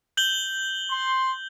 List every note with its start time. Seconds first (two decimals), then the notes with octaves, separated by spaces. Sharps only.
0.17 G6 F#7 G7
0.91 C6